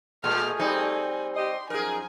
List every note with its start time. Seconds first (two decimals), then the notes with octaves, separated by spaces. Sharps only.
0.24 A#2 G#3 A3 G#4 F6
0.60 G3 C4 D#4 G#5
1.37 G4 D#5 C6
1.70 F#2 F3 D#4 G#4 A#4 G#5